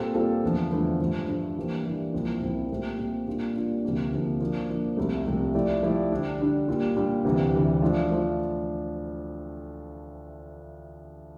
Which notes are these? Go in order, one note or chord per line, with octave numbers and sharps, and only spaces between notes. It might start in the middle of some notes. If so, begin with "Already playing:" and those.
Already playing: A#2 G3 C4 F4 A4
A#2 G3 C4 F4 A4
E2 D3 F3 A3
E2 D3 F3 A3
G2 F3 A3
G2 F3 A3
E3 G3 A#3 D4
E3 G3 A#3 D4
C2 A#2 F3 C4 E4
C2 A#2 F3 C4 E4
A#2 A3 C4 G4
A#2 A3 C4 G4
A#2 G3 D4 F4
A#2 G3 D4 F4
D2 C3 F3 A#3
D2 C3 F3 A#3
F3 A#3 D4
F3 A#3 D4
C2 C3 F3 A3
C2 C3 F3 A3
F3 A3 E4 G4 D5
F3 A3 E4 G4 D5
D3 G3 D4
D3 G3 D4
A#2 G3 D4
A#2 G3 D4
D2 C3 E3 G3
D2 C3 E3 G3
F3 A3 D4 F4
F3 A3 D4 F4